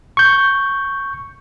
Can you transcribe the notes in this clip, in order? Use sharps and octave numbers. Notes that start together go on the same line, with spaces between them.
C#6 G6